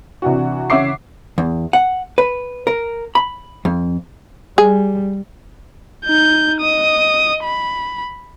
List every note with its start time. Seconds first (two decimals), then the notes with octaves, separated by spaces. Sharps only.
0.22 C3 E3 D4 F#4
0.70 C#3 C#5 E5 F#5 D6 C7
1.38 E2
1.73 F#5
2.18 B4
2.67 A#4
3.15 B5
3.65 F2
4.58 G3 G#4
6.05 D#4 G6
6.61 D#5 D#6
7.44 B5